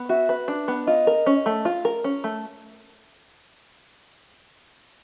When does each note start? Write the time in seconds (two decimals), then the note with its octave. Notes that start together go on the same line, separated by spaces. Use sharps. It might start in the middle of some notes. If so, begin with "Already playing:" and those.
Already playing: B3
0.09 F#4 E5
0.29 B4
0.48 D4
0.68 B3
0.87 F4 D#5
1.07 A#4
1.26 C#4
1.46 A3
1.65 F4
1.85 A#4
2.04 C#4
2.24 A3